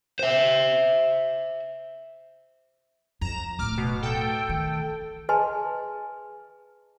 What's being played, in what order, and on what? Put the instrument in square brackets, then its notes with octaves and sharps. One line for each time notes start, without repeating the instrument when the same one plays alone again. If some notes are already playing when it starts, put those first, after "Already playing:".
[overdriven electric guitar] C5 E5
[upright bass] F2 [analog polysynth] A#5 E7
[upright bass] D1 A2 [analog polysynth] D6 F6
[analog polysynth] B2
A4 G5
[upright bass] D#3
[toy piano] G#4 B4 D#5 G#5 A5 C6